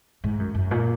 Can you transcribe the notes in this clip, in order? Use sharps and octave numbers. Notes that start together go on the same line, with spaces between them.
G#2
F#2
F#2
A#2